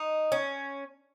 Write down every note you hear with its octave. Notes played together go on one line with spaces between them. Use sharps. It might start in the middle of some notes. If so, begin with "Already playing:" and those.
Already playing: D#4
C#4